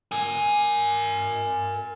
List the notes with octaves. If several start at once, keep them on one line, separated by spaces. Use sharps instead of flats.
A#4 G#5